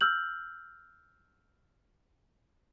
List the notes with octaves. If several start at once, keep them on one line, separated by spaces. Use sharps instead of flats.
E6 F6 G6 F#7